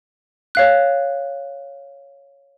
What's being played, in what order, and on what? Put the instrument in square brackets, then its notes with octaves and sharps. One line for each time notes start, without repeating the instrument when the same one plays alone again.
[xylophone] C#5 F5 F#6